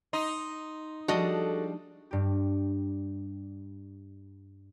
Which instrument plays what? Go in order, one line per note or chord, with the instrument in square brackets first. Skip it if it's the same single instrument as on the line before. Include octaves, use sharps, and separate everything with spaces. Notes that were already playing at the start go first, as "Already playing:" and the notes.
[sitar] D#4 [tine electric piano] C6 D#6
[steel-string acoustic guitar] F3 G3 G#3 [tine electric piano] D4 [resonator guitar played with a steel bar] F#4 A4 D#5
[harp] G2 G4